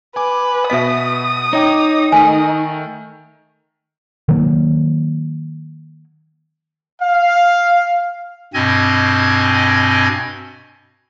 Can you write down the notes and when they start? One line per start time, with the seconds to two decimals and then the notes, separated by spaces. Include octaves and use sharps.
0.16 B4 G#5 D6
0.70 B2 B3 D#5 E5 D#6 B6
1.53 D#4 C#5 G5 D6
2.12 D#3 A3 G#5
4.29 D#3 F#3 A#3
7.01 F5
8.54 G2 B2 C4 D#5 G#5 G#6